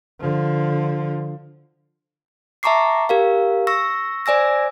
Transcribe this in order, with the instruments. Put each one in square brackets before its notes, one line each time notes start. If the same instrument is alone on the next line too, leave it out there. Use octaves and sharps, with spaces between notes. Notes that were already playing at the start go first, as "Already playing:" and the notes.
[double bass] D3 F3
[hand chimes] E5 A5 A#5 C#6 D6 C7
G4 A#4 F5
C#6 E6 A#6
C5 D5 G#5 E6 A#6